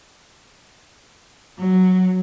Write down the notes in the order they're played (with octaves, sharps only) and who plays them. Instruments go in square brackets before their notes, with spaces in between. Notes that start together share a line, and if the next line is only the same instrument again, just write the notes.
[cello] F#3